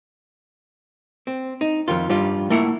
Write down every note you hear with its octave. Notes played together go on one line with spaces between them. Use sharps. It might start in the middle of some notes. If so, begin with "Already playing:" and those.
C4
D#4
F2 G#2 D#3 F4
G2 G3 F4
A3 A#3 E4 F#5